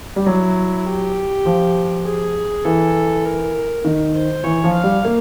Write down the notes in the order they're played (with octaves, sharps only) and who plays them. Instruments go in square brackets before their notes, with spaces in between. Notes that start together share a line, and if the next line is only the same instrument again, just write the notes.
[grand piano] G3
[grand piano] F#3 [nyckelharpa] E4
[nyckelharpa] G4
[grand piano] F3
[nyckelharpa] G#4
[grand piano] E3 [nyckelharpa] A4
[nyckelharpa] A#4
[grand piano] D#3
[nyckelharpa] C5
[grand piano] E3 [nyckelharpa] C#5
[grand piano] F3
[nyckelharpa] F5
[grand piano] G3
A#3